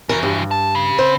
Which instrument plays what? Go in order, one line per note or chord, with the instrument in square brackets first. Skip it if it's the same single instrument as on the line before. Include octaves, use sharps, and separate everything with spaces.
[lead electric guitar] E3 F#4 [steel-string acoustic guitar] A#4
[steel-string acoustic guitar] G2
[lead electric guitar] A5
C#3
[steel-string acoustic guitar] C4 C5